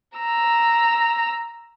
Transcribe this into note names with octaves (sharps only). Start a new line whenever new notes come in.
A#5 E6